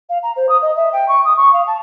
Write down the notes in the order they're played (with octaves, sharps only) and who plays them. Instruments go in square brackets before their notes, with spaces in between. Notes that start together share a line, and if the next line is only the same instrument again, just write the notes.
[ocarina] F5
A#5
C5
D#6
D#5
E5
G5
C#6
D#6
C#6
F5
A5